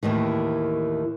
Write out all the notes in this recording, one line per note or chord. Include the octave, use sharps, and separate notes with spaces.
D#2 A2 D#3 E3